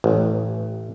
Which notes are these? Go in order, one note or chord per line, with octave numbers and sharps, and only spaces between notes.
A1